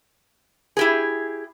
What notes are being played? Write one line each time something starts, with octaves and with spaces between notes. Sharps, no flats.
E4 G4 G#4